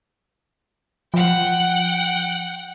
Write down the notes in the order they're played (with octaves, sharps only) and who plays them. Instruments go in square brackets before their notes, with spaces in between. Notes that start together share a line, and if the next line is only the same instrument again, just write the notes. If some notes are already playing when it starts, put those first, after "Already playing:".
[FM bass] F3 [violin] F#5 G5